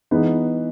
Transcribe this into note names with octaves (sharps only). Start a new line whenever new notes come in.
E3 G#3 B3 D#4